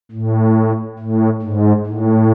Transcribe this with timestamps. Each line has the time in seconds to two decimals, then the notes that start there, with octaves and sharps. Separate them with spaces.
0.11 A2
0.99 A2
1.42 G#2
1.86 A2